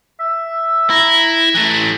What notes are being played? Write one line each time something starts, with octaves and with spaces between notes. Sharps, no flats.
E5
E4 A#5
E3 A3 A#5